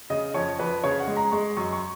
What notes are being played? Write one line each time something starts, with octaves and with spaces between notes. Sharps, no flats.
C#3 D#5
F2 C#5
F2 B4
C#3 C#5
F#5
G#3
A#5
G#3 C#6
F#2 C#6
C#6